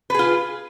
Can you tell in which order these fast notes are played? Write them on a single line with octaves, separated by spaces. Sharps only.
B4 G#4 F4